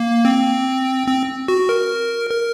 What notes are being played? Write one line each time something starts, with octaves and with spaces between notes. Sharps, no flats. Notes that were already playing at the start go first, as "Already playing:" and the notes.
Already playing: A#3
C4
C4
F#4
A#4
A#4